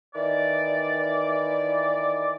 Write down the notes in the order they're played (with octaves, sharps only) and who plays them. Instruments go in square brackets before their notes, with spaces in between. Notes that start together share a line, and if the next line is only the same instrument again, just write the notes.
[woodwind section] D#3 E3 D5